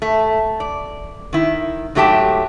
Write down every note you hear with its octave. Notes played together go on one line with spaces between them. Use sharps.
A3
D5
D#3 E4
G#2 F#3 A3 G4 G5 A5